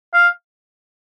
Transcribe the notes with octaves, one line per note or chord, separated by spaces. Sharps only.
F5